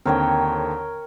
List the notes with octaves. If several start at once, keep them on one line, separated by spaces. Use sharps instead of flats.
D#2 D3 C4 A#4 C#5 G5